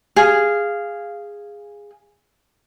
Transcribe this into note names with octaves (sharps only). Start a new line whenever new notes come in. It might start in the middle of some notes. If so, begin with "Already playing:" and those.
G#4 F5